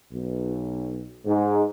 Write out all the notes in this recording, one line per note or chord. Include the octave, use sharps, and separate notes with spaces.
B1
G#2